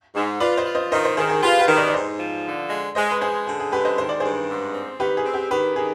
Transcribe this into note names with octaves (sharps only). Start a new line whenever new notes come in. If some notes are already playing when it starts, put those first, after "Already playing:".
G#2
F4 B4 D5
C5 D#5
F4
C5 D#5
D#3 C5 D#5
C5 D#5
D#3 G#4 C5
G#4
F4 G4 B4
G4 B4
D#3
B4 D5
D5
G#2 C5 D#5
F3
D3
G#3
G#3 C5 D#5
B4
G#3 G#4 C5
D3 G#4
G#4
G#3 G4 B4
C5 D#5
D#3 C5
D5
G2 G#4 C5
G#2
C4
D#3 G4 B4
G#4
C4
G4
D#3 G4 B4
D#3 G#4